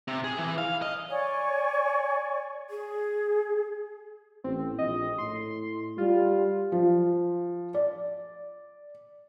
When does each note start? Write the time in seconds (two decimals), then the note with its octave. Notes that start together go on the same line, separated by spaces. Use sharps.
0.08 C3
0.24 G#4
0.38 E3
0.58 F5
0.82 D#5
1.10 C#5 D5 G#5 C#6
2.70 G#4
4.44 A1 C4
4.79 A#1 D#5
5.18 A2 C6
5.98 G3 F4
6.72 F3
7.74 D5